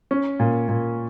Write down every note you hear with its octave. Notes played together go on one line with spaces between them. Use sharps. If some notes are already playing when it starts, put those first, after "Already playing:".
C#4
A#2
A#2